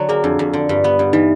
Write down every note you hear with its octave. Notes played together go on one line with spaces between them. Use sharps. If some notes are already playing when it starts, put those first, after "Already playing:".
Already playing: D3 F#3
A#3 G#4
F2 D4
F2
D3
G2
B3
G2
E3 D#4